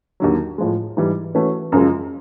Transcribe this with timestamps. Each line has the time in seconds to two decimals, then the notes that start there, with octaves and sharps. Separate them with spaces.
0.20 D#2 D3 F#3
0.58 A2 F3 G#3
0.97 G#2 E3 G3
1.35 E3 A3 C#4 F#4 B4
1.72 F#2 C#3 F3 G#3